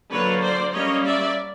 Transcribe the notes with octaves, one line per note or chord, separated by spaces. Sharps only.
D3 F#3 A#3 B4 C#5
C5 D5
G3 A#3 C#4 C#5 D#5
D5 E5